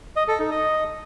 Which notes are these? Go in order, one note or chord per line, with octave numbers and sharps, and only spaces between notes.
D#5
A4
D#4
D#5